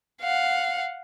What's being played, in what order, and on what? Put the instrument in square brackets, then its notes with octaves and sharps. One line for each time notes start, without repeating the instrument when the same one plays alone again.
[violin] F5 F#5